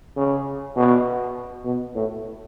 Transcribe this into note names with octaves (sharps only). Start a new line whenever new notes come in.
C#3
B2
B2
A2